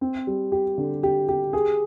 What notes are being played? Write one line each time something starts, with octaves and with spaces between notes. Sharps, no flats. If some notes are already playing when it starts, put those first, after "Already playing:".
C4
G3
G4
D3
G4
G4
G#4